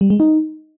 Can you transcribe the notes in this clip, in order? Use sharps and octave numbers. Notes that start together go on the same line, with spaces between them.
G3
G#3
D#4